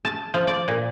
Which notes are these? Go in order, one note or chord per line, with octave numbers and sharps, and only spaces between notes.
A5
F3
D5
A#2